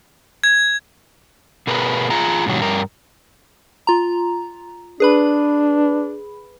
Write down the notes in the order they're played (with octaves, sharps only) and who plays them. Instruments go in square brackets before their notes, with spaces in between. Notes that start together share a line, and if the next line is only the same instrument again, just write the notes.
[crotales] G#6
[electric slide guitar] B2 G#4 A#4 B4
F4 G#4 A#5
G#2 B2 D#3 F#3 G3
G2 A#4
[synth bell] F4 A#5
[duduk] D4 [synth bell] G#4 B4 B5